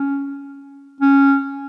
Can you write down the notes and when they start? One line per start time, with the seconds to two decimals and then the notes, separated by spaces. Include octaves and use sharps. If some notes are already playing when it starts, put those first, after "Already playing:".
Already playing: C#4
1.01 C#4